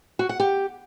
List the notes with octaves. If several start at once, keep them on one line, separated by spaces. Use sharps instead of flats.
F#4
F#5
G4